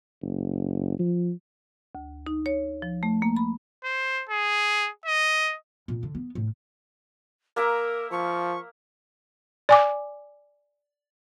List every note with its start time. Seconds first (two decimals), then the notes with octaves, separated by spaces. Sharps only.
0.22 F#1
0.99 F3
1.95 D2
2.27 D#4
2.46 C#5
2.82 F3
3.03 A3
3.22 A#3
3.36 B5
3.84 C5
4.29 G#4
5.06 D#5
5.88 A#2
6.03 D3
6.15 B3
6.35 A2
7.56 A#3 A#4 E5 A#5
8.12 F3 C#6
9.69 D5 G#5 D6